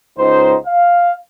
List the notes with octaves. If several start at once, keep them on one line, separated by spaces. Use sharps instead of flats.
C#2 D#4 C5
F5